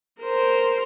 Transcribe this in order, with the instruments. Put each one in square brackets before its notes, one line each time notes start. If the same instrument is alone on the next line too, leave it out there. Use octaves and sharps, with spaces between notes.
[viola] A#4 C5